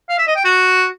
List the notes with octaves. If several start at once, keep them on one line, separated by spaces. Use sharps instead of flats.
F5
E5
D#5
G5
F#4